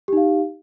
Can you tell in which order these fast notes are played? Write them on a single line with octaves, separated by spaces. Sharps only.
G4 D#4 F5